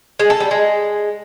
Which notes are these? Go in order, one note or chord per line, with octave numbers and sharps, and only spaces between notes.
G#3
A4
G3
G#3